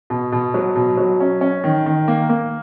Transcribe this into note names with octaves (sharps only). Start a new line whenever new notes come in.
B2
B2
F#3
B2
F#3
C#4
C#4
D#3
D#3
A#3
A#3